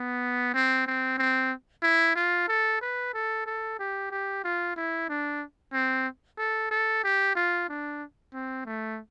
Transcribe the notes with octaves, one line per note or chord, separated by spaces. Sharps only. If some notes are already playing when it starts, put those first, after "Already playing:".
Already playing: B3
C4
C4
C4
E4
F4
A4
B4
A4
A4
G4
G4
F4
E4
D4
C4
A4
A4
G4
F4
D4
C4
A3